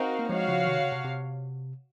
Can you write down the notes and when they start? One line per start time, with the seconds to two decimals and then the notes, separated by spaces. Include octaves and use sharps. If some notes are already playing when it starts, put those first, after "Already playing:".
Already playing: C4 D#4 F#4 A#4 F5
0.19 A#3
0.29 F3 G#3 F#4 C#5 F5
0.48 C#3 F3
0.67 C3 D#3
0.79 C#3
0.92 C3
1.05 C3